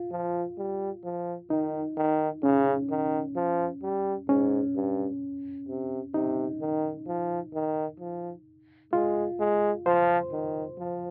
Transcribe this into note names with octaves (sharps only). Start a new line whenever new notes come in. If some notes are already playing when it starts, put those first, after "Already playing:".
Already playing: F4
F3
G3
F3
D#3 D#4
D#3
C#3 C#4
D#3
F3
G3
G#2 C#4
G2
C3
C3 D#4
D#3
F3
D#3
F3
G#3 F4
G#3
F3 C5
D#3
F3